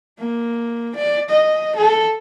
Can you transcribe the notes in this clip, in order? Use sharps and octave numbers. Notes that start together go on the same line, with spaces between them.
A#3
D5
D#5
A4